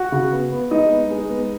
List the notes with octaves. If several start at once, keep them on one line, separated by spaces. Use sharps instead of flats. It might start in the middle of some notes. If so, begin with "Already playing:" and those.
Already playing: F#4 F#5
C#3
B3
B3
G#3 D#4 D#5
B3
G#3
B3